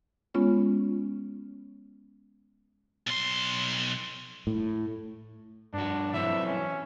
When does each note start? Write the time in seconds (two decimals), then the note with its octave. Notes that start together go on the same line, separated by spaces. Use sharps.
0.34 G#3 B3 C#4 F4 C#5
3.07 B1 C6
4.47 A2
5.73 G2 D4 F#4
6.13 E3 F#3 C4 E5
6.46 C#4